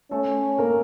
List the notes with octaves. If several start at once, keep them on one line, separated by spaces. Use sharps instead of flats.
A3 C#4 A4
A#3 A#4